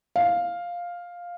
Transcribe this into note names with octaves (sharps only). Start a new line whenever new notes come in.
F5